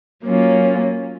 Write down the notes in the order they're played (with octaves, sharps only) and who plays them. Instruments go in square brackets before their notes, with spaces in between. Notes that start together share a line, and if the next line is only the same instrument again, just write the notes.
[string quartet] F#3 A#3 C#4 F4